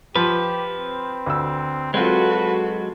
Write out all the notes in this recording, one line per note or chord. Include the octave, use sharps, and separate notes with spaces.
F3 G4 B4
C4
D2 E6
F#3 G#3 C4 F4 F#4 A4 B4